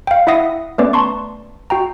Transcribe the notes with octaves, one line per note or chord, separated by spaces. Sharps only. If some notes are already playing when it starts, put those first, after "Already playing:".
F5 G5
E4 E5 F#5 D#6 A#6 C7
A3 B3 C#4 B4 D5 D6
A5 A#5 C6 C#6
F#4 G5 A#5